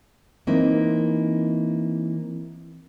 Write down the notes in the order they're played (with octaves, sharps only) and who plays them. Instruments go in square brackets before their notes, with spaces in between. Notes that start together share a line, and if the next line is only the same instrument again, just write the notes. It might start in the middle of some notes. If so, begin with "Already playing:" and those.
[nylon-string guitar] E3 A#3 C4 D#4